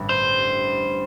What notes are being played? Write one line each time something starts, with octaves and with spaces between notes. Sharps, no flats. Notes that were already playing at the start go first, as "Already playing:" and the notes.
Already playing: A1 G2 D3
C5